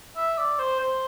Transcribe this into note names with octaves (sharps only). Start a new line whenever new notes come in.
E5
D5
C5
C5